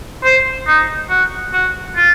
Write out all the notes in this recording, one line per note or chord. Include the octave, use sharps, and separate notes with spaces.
C5
D#4
F#4
F#4
F4